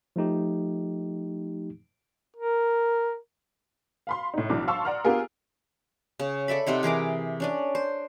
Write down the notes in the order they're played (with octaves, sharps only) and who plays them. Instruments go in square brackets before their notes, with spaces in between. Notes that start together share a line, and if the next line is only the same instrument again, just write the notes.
[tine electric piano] F3 A3 D#4 G4
[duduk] A#4
[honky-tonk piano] F5 B5 C6
A2 D#4
B1 E3 D4 D6
F5 A5 C6 C#6 E6
D5 F#5 A#5 C6 F6
B3 D4 F4 G4 G#4 A#4
[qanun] C#3
A4 D5 E5 B5
C3 C4 D#4 F#5
E3 G#4 A#4 D6
C#4 D4 D5
C5